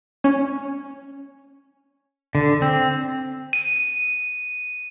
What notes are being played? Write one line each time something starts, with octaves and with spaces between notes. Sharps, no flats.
C#4
D3
C4
D#7